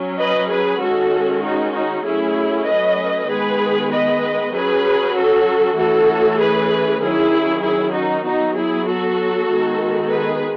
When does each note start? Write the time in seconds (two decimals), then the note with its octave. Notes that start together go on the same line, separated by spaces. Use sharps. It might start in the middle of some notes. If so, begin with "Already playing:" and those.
Already playing: F#3 C#4
0.17 B4 D#5
0.48 G#4 B4
0.80 D#3 G#3 C#4 F#4 A4
1.41 D#4 F#4
1.72 D#4 F#4
2.03 F#3 A3 C#4 E4 G#4
2.65 B4 D#5
3.28 D#3 G#3 B3 G#4 B4
3.90 B4 D#5
4.52 F#3 C#4 G#4 B4
5.13 F#4 A4
5.76 E3 A3 C#4 F#4 A4
6.38 G#4 B4
7.01 D#3 F#3 C#4 E4 G#4
7.62 E4 G#4
7.93 D#4 F#4
8.24 F#3 B3 D#4 F#4
8.56 E4 G#4
8.86 F#4 A4
9.48 D#3 G#3 B3
10.10 G#4 B4